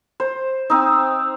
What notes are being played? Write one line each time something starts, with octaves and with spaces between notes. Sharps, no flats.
C5
C4 D#4